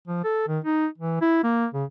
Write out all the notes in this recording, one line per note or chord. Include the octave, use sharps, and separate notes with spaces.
F3
A4
D#3
D#4
E3
E4
A#3
C#3